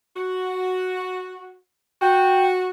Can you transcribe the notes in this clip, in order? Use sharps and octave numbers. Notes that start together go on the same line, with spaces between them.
F#4
F#4 G5